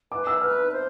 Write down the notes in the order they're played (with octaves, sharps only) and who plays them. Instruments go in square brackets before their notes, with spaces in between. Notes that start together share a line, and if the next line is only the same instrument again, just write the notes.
[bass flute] B4 [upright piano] D6
[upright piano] E6
[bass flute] B4 [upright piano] F6
[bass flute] C5